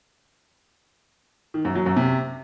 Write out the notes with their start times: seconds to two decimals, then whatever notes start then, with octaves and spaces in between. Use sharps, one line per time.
1.54 D#3
1.65 F#2
1.75 F#3
1.86 F#2
1.97 C3